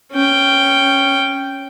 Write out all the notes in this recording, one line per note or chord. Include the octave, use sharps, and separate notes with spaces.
C#4 G5